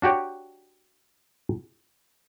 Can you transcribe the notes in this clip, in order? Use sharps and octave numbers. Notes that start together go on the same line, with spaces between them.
D4 F#4 G4 C#5